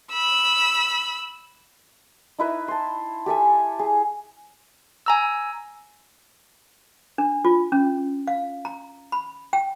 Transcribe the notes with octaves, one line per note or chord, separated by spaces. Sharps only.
B5 E6
D#4 E4 B4 E5
A5 C6
G4 A4 E5 G#5
G#4
G#5 A#5 E6
D4
F4
C#4
F5
A#5
B5
G5